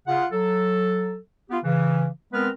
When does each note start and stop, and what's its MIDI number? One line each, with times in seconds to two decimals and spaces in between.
0.07 0.26 49
0.07 0.26 65
0.07 0.26 78
0.32 1.16 54
0.32 1.16 69
1.50 1.59 59
1.50 1.59 65
1.50 1.59 67
1.64 2.08 49
1.64 2.08 52
2.33 2.49 56
2.33 2.49 59
2.33 2.49 60
2.33 2.49 70
2.33 2.49 71
2.33 2.49 89